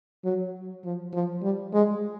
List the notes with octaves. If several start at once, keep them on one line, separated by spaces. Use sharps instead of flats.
F#3
F3
F3
G3
G#3